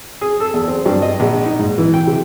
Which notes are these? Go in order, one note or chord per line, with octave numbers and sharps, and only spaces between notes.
G#4
A4
E2
C4
G2
D#5
A#1
D#4
G#2
E3
G5
C3